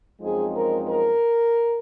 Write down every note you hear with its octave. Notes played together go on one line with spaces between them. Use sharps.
F#2 F3 G#3 C4 D#4 G#4
A#4
A#4